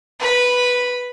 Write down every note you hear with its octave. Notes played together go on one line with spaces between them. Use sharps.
B4 B5